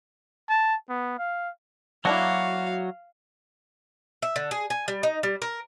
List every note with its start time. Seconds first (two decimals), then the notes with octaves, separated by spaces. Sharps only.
0.49 A5
0.89 B3
1.18 F5
2.05 F#3 A#3 D4 E4 F#4 F5
4.22 E5
4.36 D3
4.51 G#4
4.70 G#5
4.88 G3
5.03 D#4
5.23 G3
5.42 A#4